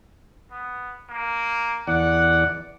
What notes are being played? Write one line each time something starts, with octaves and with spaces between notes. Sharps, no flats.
B3
A#3
E2 D5 F#5